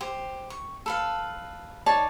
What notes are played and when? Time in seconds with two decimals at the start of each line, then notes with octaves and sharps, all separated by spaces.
0.01 G4 C5
0.50 C#6
0.86 A4 B4 F5
1.86 D#4 C#5 D5 A5